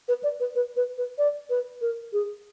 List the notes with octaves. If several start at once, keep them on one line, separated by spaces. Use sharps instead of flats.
B4
D5
B4
B4
B4
B4
D5
B4
A#4
G#4